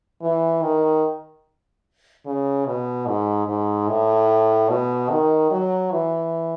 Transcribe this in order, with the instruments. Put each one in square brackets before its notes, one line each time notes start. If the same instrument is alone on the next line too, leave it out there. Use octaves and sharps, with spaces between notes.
[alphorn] E3
D#3
C#3
B2
G#2
G#2
A2
B2
D#3
F#3
E3